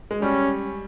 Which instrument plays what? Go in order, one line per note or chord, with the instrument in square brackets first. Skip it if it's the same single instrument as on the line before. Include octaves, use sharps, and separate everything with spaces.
[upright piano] G#3
[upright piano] G3 [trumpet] C#4